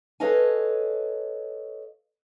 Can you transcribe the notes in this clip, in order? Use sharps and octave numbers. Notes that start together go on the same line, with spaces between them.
A4 B4 C#5 D#5 F5 G#5